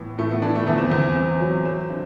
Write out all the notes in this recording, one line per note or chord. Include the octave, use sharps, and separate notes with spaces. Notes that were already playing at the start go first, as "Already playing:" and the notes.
Already playing: A2 E3 B3
A2 A3
B3
E3 D4
A3
E2 B3
C4
E2 B3
E2
F#3
F#3 C4
D3